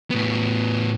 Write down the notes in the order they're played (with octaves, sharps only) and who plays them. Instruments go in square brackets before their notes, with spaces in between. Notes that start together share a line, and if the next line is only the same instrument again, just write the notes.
[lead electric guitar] A2 B3